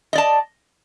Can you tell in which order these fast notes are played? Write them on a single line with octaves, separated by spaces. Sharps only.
D#5 D5 A5